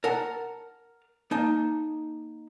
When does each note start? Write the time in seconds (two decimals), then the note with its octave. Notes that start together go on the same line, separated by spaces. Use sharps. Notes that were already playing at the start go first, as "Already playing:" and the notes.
0.04 A#4 F#5 A5
1.31 A#3 D#4 A5